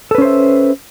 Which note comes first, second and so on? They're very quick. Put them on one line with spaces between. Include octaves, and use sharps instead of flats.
A4 B4 C#4 C5 E5